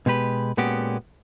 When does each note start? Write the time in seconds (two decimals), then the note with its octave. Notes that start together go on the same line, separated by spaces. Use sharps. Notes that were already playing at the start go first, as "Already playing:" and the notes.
0.06 B2 G#3 G4 B4
0.58 A#2 G#3 B3 C#4 F#4 G4